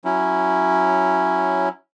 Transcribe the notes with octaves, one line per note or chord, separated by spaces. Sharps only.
F#3 C#4 E4